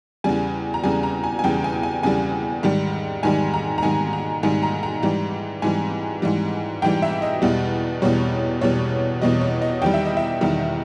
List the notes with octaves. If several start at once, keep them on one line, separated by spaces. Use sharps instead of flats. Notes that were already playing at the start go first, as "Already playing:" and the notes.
E2 C#3 G3 G#5
A#5
E2 C#3 G3 G#5
A#5
G#5
G#5
E2 C#3 G3 G5
G#5
G#5
E2 C#3 G3 G#5
G#2 D#3 G3
G#2 D#3 G3 G#5
A#5
A#5
G#2 D#3 G3 G#5
A#5
G#2 D#3 G3 G#5
A#5
A#5
G#2 E3 G3
G#2 E3 G3 G#5
G#2 E3 G3
G#2 E3 G3 G5
E5
D#5
E2 B2 G3
E2 B2 G3 C#5
E2 B2 G3 C#5
E2 B2 G3 D#5
C#5
D#5
E2 D#3 G3 G5
E5
D#5
E5
E2 D#3 G3